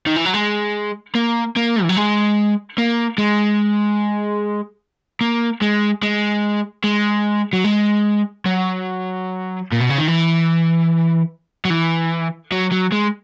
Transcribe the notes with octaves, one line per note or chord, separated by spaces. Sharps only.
D#3
E3
F#3
G#3
A#3
A#3
E3
F#3
G#3
A#3
G#3
A#3
G#3
G#3
G#3
F#3
G#3
F#3
A#2
B2
C#3
D#3
E3
F#3
E3
F#3
F#3
G#3